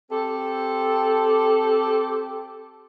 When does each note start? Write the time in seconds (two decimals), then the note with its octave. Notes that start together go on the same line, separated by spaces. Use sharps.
0.10 C4 G4 A4